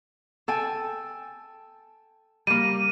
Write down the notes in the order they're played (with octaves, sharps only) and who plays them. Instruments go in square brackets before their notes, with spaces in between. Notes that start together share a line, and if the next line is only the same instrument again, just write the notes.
[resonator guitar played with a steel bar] A4 G5 G#5
[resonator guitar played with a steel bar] G3 A#3 [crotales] D#7